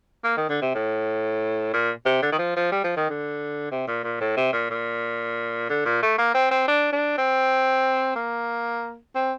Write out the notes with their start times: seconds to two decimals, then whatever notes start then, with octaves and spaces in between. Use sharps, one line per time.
0.24 A#3
0.37 D#3
0.49 D3
0.62 C3
0.75 A2
1.74 A#2
2.06 C3
2.22 D3
2.32 D#3
2.38 F3
2.56 F3
2.72 G3
2.84 F3
2.97 D#3
3.09 D3
3.71 C3
3.87 A#2
4.04 A#2
4.21 A2
4.37 C3
4.53 A#2
4.70 A#2
5.69 D3
5.85 A#2
6.02 A3
6.18 A#3
6.34 C4
6.51 C4
6.68 D4
6.92 D4
7.18 C4
8.16 A#3
9.15 C4